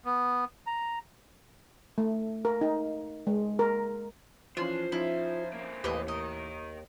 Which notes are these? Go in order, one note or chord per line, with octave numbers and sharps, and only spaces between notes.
B3
A#5
A3
A#4
D#4
G#3
A#4
E3 F3 C#4 D4 F4 C5
F3 C#4 D#4 E4 C5
A#3 C4
D#2 A2 E3 G4 B4 D#5
D#3 A#4 D#5